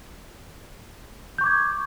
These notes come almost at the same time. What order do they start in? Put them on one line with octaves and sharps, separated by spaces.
G6 C#6 D6 G#6